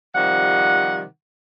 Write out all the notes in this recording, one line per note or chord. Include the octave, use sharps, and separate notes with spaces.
C3 D#3 F3 G3 F#5